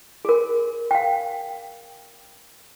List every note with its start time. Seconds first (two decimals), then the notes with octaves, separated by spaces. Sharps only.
0.25 G#4 A#4
0.91 F5 G5